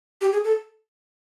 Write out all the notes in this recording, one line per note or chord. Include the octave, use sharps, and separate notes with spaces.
G4
G#4
A4